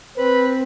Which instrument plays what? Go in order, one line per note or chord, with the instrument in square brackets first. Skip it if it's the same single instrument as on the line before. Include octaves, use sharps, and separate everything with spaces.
[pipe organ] C4 [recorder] B4